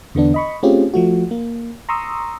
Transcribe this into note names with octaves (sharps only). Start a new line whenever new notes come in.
E2 D3 B3 D4
D#5 B5 C#6
A3 C4 C#4 F4 G4 G#4
F3 A3 F#4
A#3
A#5 C6 C#6 D#6 E6